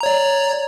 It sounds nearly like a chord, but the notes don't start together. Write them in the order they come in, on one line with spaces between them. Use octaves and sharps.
A#5 C#5 D5